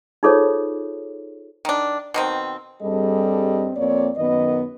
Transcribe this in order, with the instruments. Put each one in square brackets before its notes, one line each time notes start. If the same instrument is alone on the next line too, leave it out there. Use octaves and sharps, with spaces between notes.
[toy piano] D#4 F4 G#4 A4 C5 C#5
[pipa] D#3 D4
B2 D#3 C4
[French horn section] G2 G3 C4 G#4 A4 D#5
F2 A#3 C4 C#5 D5
F#2 D#3 B3 B4 D#5